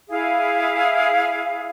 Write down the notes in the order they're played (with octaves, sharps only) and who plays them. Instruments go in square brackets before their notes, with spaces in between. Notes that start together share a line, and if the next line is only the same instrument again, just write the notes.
[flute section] E4 G#4 F5